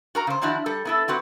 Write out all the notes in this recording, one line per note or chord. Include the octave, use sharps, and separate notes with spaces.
F#4 A#4 A#5
C#3 C5
D#3 F3 D4 E4 F#4
G3 A4
B3 E4 A4
F#3 C4 F#4 B4